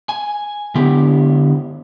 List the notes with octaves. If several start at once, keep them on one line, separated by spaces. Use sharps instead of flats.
G#5
D3 B3 E4 G4